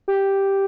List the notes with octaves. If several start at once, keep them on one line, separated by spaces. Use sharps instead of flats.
G4